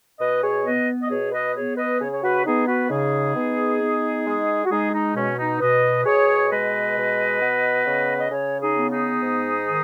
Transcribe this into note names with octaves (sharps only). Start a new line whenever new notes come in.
B2 B4 D#5
G#4 C#5
B3 B4 D#5
D#5
B2 G#4 C#5
B4 D#5
B3 G#4 C#5
B4 D#5
C#3 G#4 C#5
C#5
F#4 B4
B3 D#4 G#4
F#4 B4
C#3 D#4 G#4
B3
B3
G#3
F#4
G#3 D#4 G#4
D#4
B2 C#4
D#4
B2 B4 D#5
B2 G#4 C#5
G#3 B4 D#5
B2
B3
C#3
D#5
C#3 G#4 C#5
D#4 G#4
B3
D#4 G#4
G#2
D#3